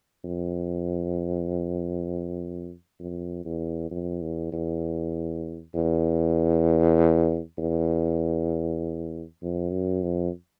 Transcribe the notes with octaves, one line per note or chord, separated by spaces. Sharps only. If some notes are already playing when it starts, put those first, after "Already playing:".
F2
F2
E2
F2
E2
E2
E2
E2
F2
F#2
F2